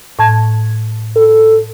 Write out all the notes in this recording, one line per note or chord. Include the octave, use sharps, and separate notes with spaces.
A2 A5 G#6
A4